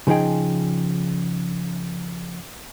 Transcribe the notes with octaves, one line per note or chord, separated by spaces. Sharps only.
C#3 F3 D#4 G#4 G5